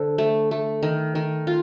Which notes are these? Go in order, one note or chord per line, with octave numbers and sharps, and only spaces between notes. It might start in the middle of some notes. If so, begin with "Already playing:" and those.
Already playing: D3 A4 C5
A3
A3
D#3
D#3
F4